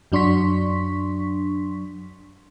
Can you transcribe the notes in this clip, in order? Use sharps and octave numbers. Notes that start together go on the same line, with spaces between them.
F#2 F#3 D4 C6 C#6 B6